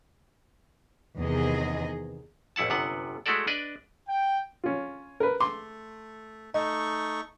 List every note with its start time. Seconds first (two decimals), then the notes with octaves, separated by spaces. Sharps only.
1.18 E2 C3 D#3 B3 G#4 D#5
2.56 A1 F2 E4 F#5 A5
2.70 G1 F#2 C3 B3 F#5
3.26 G#3 A3 E4 F#4 A4 D5
3.47 D4 B4 D5 D#5
4.07 G5
4.64 C#4 F4
5.20 A#4 B4
5.40 A3 C6 D6
6.54 A3 D#4 D#5 C#6